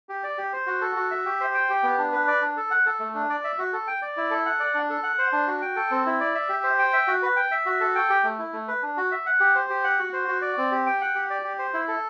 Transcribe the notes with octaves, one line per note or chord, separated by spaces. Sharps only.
G4
D5
G4
C5
F#4
A4
F#4
E5
G4
C5
G5
G4
B3
D4
B4
D5
D4
A4
F#5
A4
A3
D4
D5
E5
F#4
A4
G5
D5
E4
A4
F#5
D5
D4
A4
F#5
C5
D4
F#4
G5
A4
C4
E4
D5
E5
G4
C5
G5
E5
F#4
B4
G5
E5
F#4
A4
G5
G4
A3
E4
A3
B4
D4
F#4
E5
F#5
G4
C5
G4
F#5
F#4
C5
F#4
D5
C4
G4
G5
F#5
G4
D5
G4
C5
E4
A4